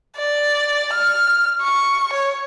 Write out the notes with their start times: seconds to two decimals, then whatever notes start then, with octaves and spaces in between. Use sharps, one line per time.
0.17 D5
0.93 F6
1.62 C#6
2.13 C#5